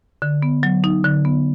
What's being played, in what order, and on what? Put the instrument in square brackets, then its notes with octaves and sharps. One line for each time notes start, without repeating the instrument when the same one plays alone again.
[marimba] D3
B3
F#3
D#4
D3
B3